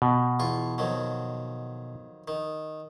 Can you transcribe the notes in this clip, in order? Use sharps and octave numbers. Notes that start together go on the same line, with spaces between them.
B2
E2 F4 C#6
F2 D#3 F#3
D#3